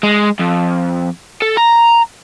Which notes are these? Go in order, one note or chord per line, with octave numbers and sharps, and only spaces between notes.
G#3
F2
A4
A#5